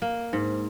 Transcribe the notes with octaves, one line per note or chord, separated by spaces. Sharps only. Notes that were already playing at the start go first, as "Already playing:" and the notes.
A#3
G#2